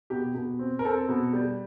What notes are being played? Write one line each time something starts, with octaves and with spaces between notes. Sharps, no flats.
B2 G4
B2
C4
A#4
C4 A4
B2
G3